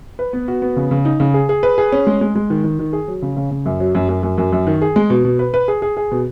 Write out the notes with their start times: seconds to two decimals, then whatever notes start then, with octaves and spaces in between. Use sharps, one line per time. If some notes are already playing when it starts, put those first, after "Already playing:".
0.19 B4
0.33 B3
0.48 F#4
0.62 B3
0.77 C#3
0.91 C#3
1.05 D#4
1.20 C#3
1.34 G#4
1.49 G#4
1.63 B4
1.78 G#4
1.92 C#4
2.07 G#3
2.21 G#3
2.35 G#3
2.50 D#3
2.64 D#3
2.79 D#3
2.93 G#4
3.08 F#3
3.22 C#3
3.37 C#3
3.51 C#3
3.66 F#2
3.80 F#3
3.95 F#2
4.09 F#2
4.23 F#2
4.38 F#2
4.52 F#2
4.67 D#3
4.82 G#4
4.96 G#3
5.10 B2
5.25 B2
5.39 B4
5.54 B4
5.68 G#4
5.82 G#4
5.97 G#4
6.11 B2